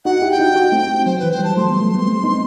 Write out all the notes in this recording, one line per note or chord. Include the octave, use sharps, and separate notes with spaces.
D#4 F#4 F#5
E4 G4
G5
D#4 F#4
D#4 F#4
A3 C4
F#3 C5
E3 B4
C5
E3 G3 A5
F#3 A3 C6
G3 B3
F#3 A3
G3 B3
A3 C4
B3 D#4